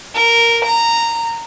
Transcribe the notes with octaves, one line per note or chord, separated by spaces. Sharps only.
A#4
A#5